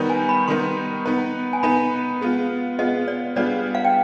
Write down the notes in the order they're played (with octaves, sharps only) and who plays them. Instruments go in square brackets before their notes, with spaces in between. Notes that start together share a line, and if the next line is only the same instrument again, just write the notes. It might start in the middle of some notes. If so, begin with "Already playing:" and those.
Already playing: [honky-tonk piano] D#3 G3 B3 D#4 B4
[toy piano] G#5
B5
[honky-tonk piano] D#3 G3 B3 D#4 B4 [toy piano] C6
[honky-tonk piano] B3 D#4 B4
[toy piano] G#5
[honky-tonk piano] B3 D#4 B4 [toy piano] B5
[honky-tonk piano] G#3 B3 F4
[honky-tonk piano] G#3 B3 F4 [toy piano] D#5
[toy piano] D5
[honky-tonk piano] G3 B3 D4 F4 G#4 [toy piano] D5
[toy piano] F5
G5